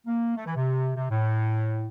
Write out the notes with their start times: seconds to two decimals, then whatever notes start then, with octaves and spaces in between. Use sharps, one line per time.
0.07 A#3
0.36 A3
0.46 E3
0.56 C3
0.96 C3
1.10 A2